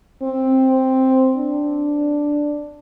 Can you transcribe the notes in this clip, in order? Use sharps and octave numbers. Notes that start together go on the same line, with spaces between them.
C4
D4